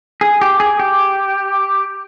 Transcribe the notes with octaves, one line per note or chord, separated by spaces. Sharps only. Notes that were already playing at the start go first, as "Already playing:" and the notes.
G#4
G4
G#4
G4